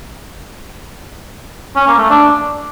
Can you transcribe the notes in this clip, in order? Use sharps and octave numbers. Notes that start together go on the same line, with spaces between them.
C#4
A#3
A3
D4